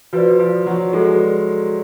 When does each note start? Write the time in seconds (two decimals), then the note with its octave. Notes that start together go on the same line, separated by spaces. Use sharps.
0.13 F3 F#4 B4 D5
0.39 F3
0.66 F#3
0.92 G#3 F#4 A4 D5